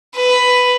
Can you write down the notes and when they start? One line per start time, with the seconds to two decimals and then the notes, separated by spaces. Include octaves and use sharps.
0.16 B4